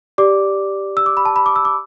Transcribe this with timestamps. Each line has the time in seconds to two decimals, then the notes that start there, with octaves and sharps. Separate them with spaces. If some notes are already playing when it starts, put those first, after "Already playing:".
0.18 G4 D5 D6
0.97 E6
1.06 D6
1.17 B5
1.25 A5
1.36 B5
1.46 D6
1.56 E6
1.65 D6